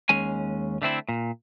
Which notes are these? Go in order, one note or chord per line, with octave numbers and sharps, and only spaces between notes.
D#2 G#3 C#4 G#5
D3 A3 C4 E4
A#2